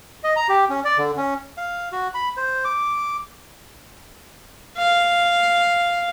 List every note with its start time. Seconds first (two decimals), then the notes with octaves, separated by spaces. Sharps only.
0.24 D#5
0.36 A#5
0.49 G4
0.70 C#4
0.85 D5
0.98 D3
1.17 C#4
1.57 F5
1.92 F#4
2.14 B5
2.37 C5
2.64 D6
4.77 F5